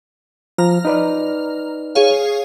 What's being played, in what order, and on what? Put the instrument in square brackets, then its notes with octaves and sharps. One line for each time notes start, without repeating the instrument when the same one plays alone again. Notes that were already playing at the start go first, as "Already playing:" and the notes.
[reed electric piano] F3 [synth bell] A#5 F6
[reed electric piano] D#4 B4 D5
[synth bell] G#4 C#5 F5